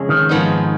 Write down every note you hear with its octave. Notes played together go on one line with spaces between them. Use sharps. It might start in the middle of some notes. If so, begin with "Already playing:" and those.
Already playing: F2 C#3 G#3
D#3
G#2 F3 B3 D#4